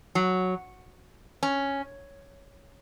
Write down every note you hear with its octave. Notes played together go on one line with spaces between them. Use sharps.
F#3
C#4